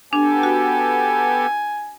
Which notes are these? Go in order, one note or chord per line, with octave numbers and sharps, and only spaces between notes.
B3 D4 G4 A4 G#5
F#4